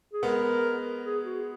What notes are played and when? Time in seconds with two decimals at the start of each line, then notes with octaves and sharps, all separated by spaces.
0.13 G#4
0.23 G#3 B3 A#4
1.04 G#4
1.25 F#4